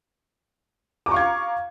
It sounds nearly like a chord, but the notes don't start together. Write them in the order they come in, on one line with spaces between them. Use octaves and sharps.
D6 A#5 C#6 F5 G#6